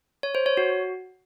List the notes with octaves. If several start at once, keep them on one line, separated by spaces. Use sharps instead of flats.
C#5
C5
C#5
F#4